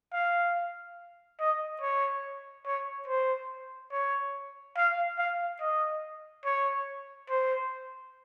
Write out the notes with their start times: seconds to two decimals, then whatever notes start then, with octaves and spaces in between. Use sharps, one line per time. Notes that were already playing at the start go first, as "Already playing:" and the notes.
0.13 F5
1.40 D#5
1.81 C#5
2.66 C#5
3.08 C5
3.92 C#5
4.77 F5
5.19 F5
5.61 D#5
6.45 C#5
7.30 C5